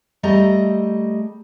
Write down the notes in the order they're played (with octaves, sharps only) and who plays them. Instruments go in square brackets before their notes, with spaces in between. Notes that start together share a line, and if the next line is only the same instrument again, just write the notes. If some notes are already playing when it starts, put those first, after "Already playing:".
[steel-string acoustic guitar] G3 A3 D#5 A#5